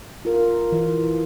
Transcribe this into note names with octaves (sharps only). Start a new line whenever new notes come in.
F4 A#4
E3